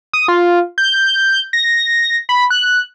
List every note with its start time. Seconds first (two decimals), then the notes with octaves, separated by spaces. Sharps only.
0.13 D#6
0.28 F4
0.78 G6
1.53 A#6
2.29 B5
2.50 F#6